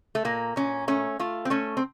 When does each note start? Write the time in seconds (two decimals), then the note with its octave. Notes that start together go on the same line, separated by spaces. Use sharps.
0.15 A3
0.25 A#2 A#3
0.56 A#2 C#4
0.88 A3 C#4
1.19 A3 F4
1.45 C4
1.50 A3 C#4
1.77 C4